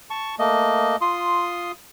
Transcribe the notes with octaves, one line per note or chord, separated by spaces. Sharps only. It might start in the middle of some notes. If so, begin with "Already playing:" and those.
A5 C#6
A3 A#3 D#5
F4 C6 D#6